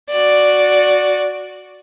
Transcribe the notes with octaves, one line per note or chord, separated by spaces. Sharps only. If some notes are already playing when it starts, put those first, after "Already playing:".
F#4 D5